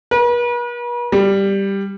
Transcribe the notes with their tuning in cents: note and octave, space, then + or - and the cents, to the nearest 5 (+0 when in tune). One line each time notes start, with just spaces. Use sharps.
B4 -45
G3 +5